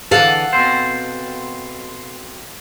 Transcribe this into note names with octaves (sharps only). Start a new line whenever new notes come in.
D3 E3 A4 F5 F#5
B2 C4 C5